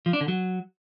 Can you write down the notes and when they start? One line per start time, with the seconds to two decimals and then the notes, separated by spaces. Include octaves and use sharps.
0.06 F3
0.13 D4
0.21 D3
0.28 F#3